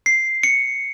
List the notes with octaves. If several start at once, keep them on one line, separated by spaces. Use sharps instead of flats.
C7
C#7